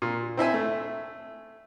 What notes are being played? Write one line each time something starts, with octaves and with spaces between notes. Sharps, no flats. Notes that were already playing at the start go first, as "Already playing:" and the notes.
A#2
C4 E4 E5 G#5
A3